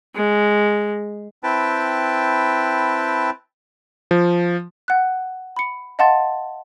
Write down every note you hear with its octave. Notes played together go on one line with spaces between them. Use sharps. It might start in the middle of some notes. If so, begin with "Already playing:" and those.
G#3
C4 E4 B4 G5 A5
F3
F#5 F#6
B5 C#7
D#5 F5 F#5 A5 C6 A6